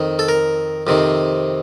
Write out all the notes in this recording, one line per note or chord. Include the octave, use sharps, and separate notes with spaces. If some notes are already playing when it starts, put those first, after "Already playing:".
Already playing: F2 D#3
A4
A#4
F2 C3 D#3